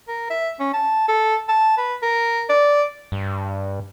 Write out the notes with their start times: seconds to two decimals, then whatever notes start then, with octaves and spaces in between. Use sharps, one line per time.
0.08 A#4
0.30 E5
0.60 C#4
0.74 A5
1.08 A4
1.48 A5
1.77 B4
2.03 A#4
2.49 D5
3.12 G2